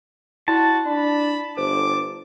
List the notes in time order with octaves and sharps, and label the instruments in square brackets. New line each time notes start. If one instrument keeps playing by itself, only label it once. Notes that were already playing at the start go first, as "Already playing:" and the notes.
[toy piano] E4 D5 C6 [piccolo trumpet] F#4 [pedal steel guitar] A5
[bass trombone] D4 [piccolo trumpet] B5
[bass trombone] G1 [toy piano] C5 [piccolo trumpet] D6